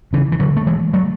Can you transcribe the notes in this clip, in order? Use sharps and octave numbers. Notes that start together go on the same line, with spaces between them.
C#3 E3
E3
D3 F#3
A3
E3 G#3
F#3 A3